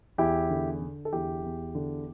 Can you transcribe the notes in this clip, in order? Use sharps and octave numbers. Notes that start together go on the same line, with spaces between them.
E2 E4 G4
D3
D3
A4
E2 E4 G4
E2
D3